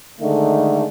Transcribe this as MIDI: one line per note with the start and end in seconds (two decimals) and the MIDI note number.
0.21 0.85 50
0.21 0.85 51
0.21 0.85 56
0.21 0.85 57